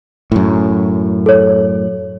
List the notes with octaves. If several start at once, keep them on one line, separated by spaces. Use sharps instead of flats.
F#2 A2
A4 C#5